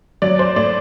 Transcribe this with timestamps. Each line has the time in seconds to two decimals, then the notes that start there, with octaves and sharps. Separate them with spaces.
0.22 F#3 D5
0.39 C5
0.56 A2 D5